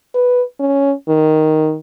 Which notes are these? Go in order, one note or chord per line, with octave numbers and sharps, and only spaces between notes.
B4
C#4
D#3